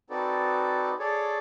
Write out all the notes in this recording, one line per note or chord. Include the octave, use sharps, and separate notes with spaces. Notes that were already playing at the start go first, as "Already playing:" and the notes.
C4 D#4 F#4 A4 B4 D5
G#4 A4 C#5 D5